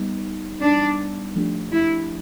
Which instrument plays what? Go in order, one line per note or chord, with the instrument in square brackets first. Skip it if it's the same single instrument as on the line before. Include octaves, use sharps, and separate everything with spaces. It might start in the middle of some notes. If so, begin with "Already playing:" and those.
Already playing: [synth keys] G3 B3 D#4
[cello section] D4
[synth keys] F3 A3 D4 G4
[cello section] E4